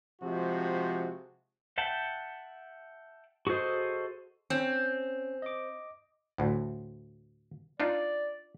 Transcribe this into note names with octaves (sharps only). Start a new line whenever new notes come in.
C3 F3 G#3 F#4
E5 F#5 G5 A5
F#4 G#4 A4 C5 D#5
C4 C#4
D#5 D6
D2 A2
D4 D#4 F4 D5